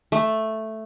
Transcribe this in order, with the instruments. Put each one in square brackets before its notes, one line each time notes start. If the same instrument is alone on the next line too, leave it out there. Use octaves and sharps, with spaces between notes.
[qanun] A3